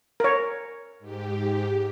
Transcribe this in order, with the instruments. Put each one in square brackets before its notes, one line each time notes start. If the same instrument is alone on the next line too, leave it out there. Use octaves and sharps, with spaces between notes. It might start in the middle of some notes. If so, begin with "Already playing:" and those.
[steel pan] A#4 C#5
[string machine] G#2 G4